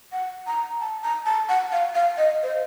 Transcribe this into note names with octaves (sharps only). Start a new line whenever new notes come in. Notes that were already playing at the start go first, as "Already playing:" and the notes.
F#5
A#5
A5
A#5
A5
F#5
F5
F5
D#5
C5